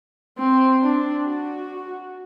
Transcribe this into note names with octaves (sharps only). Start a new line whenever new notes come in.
C4
D4
F#4